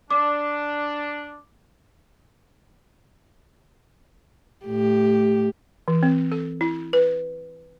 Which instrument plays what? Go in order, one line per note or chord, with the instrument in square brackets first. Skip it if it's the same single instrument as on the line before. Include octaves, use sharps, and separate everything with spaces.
[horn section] D4 [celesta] D6
[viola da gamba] A2 G4
[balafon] E3
C4
A4
E4
B4